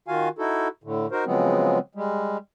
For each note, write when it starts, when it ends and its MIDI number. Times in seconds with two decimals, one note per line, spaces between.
0.08 0.29 51
0.08 0.29 65
0.08 0.29 66
0.08 0.29 77
0.08 0.29 80
0.39 0.68 63
0.39 0.68 64
0.39 0.68 66
0.39 0.68 69
0.84 1.07 45
0.84 1.07 50
1.12 1.24 63
1.12 1.24 66
1.12 1.24 70
1.12 1.24 72
1.26 1.79 49
1.26 1.79 53
1.26 1.79 54
1.26 1.79 56
1.26 1.79 59
1.26 1.79 60
1.95 2.37 55
1.95 2.37 56